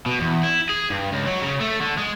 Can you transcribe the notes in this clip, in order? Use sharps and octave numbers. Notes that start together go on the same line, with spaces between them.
B2
E2
E4
G#4
G2
C#2
F#3
C#3
A3
D3
G#3